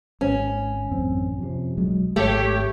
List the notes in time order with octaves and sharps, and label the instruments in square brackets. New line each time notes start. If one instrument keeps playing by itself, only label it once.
[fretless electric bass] G#1 [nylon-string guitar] C#4
[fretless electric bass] A1 F#2 C4
F2 C3
B1 F#3 G#3
[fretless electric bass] G#1 [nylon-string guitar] A3 [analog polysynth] G4 C#5